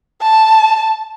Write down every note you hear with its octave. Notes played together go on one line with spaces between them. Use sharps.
A5